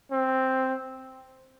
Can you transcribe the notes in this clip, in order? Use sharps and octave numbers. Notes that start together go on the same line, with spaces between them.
C4